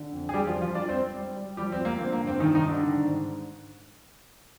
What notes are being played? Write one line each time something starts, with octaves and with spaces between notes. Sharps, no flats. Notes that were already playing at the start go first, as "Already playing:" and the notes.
Already playing: D3
F2
G#4
G3 G4
F3 F4
G3
F3 F4
G3 D4 D5
C4 C5
G3
G3
G3
F3 G3 G4
C4
F3
A#3
D3 C4
A#3
G2
C4
C3 D#3 D#4
D#3 D#4
G3
D3 D4
D#3
G#2